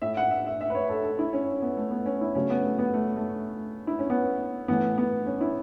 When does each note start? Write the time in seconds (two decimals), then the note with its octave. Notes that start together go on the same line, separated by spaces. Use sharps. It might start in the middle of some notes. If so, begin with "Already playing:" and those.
0.02 A2 A3 E5
0.17 F#5
0.31 E5
0.46 E5
0.61 E5
0.70 B4
0.75 C#5
0.89 A4
1.04 A4
1.19 E4
1.33 C#4
1.62 B3
1.77 A3
1.91 B3
2.06 C#4
2.21 E4
2.35 C#3 F#3 A3 C#4
2.50 B3
2.64 A3
2.79 B3
2.94 A3
3.16 A3
3.87 E4
3.99 C#4
4.10 B3
4.68 A2 E3 A3 B3
4.98 B3
5.26 C#4
5.41 E4